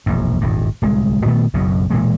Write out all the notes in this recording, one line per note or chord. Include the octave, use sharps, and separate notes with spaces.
E1 A#1 F#2
D#1 G#1 G2
D1 C2 G#3
A#2 D#3 A3 B3
F#1 B1 F#2 B2
E1 A#2 E3 G#3